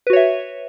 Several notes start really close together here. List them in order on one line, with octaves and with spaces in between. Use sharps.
B4 F#4 C#5 E5